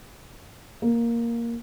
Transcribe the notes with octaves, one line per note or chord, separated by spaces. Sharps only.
A#3